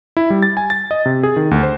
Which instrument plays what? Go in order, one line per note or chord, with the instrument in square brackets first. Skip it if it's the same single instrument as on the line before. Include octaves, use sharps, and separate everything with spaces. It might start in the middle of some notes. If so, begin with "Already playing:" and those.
[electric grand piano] E4
G3
A6
G#5
A6
D#5
C3
G#4
D#3
D2
C5